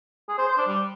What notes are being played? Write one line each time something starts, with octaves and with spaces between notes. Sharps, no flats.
G#4
C5
C5
D4
G3